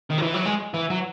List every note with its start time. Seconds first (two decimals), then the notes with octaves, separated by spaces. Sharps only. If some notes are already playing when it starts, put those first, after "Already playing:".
0.10 D#3
0.18 F#3
0.22 E3
0.34 F#3
0.46 G#3
0.74 E3
0.90 F#3